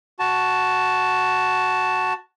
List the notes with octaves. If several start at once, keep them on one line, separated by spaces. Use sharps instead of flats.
F#4 A5